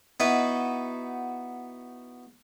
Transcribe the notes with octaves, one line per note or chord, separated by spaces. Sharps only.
B3 D#4 E4 F#4 B4